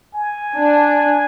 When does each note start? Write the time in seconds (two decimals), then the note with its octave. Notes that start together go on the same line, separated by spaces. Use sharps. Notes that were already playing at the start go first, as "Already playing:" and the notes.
0.14 G#5
0.56 D4